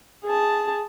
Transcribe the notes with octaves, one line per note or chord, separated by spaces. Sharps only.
G#4 A5